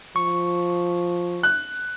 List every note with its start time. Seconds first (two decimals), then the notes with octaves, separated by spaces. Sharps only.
0.16 F3 C#6
1.43 F#6